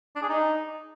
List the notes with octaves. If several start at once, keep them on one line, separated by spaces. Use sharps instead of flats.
D4
G#4
D#4